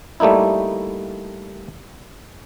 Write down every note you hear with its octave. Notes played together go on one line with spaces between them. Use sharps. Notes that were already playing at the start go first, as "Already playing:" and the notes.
G3 A3 A#3 D#4 E4